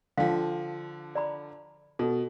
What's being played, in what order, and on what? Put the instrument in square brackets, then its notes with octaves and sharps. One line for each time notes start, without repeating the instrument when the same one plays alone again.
[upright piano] D3 F3 [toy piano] F5 G5
[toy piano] D5 A#5 B5
[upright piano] B2 [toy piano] A4